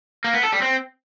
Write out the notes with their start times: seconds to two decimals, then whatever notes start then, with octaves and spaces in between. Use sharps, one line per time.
0.24 A#3
0.34 B3
0.43 A4
0.52 G3
0.62 C4